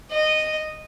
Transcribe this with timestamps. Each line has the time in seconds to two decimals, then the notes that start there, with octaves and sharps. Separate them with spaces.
0.11 D#5